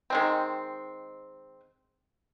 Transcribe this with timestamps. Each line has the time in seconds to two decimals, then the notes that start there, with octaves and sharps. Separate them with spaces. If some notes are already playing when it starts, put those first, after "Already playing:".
0.10 D#3 G#3 C4